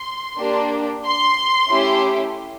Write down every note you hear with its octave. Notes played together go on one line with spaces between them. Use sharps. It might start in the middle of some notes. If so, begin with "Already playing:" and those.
Already playing: C6
A#3 D4 G4
C6
A3 C#4 E4 G4